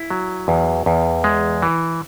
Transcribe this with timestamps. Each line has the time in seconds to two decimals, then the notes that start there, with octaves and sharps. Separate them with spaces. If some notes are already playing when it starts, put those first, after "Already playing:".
Already playing: E4
0.10 F#3
0.48 E2
0.86 E2
1.24 G#3
1.62 E3